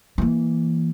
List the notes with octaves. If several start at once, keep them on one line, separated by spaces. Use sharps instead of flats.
E3 A#3